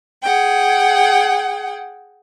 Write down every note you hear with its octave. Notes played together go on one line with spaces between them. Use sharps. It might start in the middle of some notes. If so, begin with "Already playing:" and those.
G#4 F#5 G5